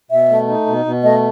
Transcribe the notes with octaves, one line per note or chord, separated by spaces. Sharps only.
B2 E5
A3
D#4
B2
B2
A3 D#5